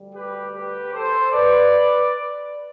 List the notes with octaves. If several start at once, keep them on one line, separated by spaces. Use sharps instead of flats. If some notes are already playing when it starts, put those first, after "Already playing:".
Already playing: D2 D3 G3
G4 B4
G4 B4
A4 C5
B4 D5